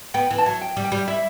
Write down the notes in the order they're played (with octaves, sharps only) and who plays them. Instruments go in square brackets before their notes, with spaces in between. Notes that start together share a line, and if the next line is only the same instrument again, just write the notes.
[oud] B3 [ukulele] G5
[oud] E3
[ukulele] A5
[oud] F#3
[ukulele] G5
[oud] G3
[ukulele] G5
[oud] G3
[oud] E4 [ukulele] E5